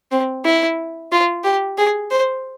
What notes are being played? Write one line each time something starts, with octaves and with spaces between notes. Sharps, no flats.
C4
E4
F4
G4
G#4
C5